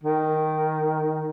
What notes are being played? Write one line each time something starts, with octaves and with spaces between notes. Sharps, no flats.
D#3